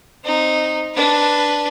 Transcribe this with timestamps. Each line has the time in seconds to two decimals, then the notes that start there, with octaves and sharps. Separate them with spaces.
0.24 C4 D#4
0.94 D4 B4